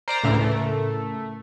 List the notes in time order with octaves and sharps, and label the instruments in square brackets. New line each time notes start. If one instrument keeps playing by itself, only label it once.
[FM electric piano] A#4 [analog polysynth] C5 D5 A#5
[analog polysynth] D2 E3 [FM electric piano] A2 C#3 A#4
[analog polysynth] A3